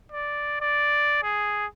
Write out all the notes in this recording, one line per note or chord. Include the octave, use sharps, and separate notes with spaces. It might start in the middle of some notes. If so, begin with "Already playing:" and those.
D5
D5
G#4